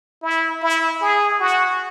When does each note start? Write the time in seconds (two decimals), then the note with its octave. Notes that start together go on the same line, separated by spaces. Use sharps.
0.23 E4
0.62 E4
1.01 G#4
1.40 F#4